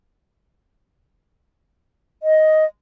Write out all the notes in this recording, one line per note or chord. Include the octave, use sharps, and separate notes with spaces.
D#5